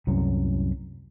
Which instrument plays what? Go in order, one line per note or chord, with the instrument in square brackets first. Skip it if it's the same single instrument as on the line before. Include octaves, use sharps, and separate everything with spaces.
[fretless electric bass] C2 F#2 A2 F#3